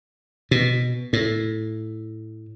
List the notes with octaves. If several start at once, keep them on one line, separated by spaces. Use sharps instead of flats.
B2
A2